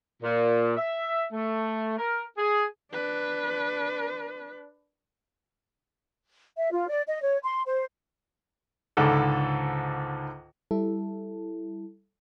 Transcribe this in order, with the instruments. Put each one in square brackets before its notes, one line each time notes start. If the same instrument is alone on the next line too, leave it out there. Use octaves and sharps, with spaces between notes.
[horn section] A#2
E5
A3
A#4
G#4
[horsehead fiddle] D4 B4
[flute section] E5
F4
D5
D#5
C#5
C6
C5
[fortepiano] C#2 G#2 D3 A4
[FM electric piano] G3 E4 A4